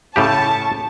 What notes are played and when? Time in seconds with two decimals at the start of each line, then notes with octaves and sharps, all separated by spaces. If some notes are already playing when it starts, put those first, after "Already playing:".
0.16 A2 C#3 G4 A5 C#6